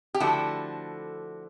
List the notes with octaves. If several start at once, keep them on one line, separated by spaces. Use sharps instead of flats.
G4
D3 F3 A3 E4 F#4